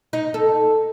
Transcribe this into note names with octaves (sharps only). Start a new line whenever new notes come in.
D#4
A4